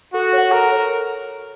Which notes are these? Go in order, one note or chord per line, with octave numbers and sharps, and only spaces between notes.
F#4 A4
C#5 F#5
A4 A#4
C#5